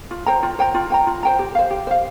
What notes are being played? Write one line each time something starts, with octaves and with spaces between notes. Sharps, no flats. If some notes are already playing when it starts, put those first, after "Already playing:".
F4
C5 G5 A#5
F4
C5 G5 A#5
F4
C5 G5 A#5
F4
C5 G5 A#5
G4
C5 F5
G4
C5 F5